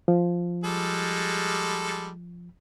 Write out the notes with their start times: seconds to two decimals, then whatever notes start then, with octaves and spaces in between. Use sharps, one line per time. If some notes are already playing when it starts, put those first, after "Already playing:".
0.08 F3
0.64 G3 G#3 A4